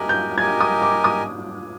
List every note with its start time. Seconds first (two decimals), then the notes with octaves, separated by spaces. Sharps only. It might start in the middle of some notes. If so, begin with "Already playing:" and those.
Already playing: G4 A#4 D#5 G#5 F#6
0.09 G6
0.38 G4 A#4 D#5 G#5 G#6
0.61 D#6
0.82 D6
1.04 D#6